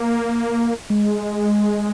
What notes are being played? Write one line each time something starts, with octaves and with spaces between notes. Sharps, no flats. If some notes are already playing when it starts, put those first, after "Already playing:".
Already playing: A#3
G#3